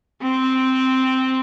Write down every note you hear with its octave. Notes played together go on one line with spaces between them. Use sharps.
C4